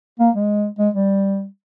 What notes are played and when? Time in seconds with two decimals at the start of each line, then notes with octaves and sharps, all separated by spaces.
0.20 A#3
0.35 G#3
0.79 G#3
0.94 G3